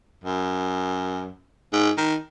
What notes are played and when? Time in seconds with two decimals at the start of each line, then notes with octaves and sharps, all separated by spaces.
0.24 F#2
1.73 G#2
1.97 D#3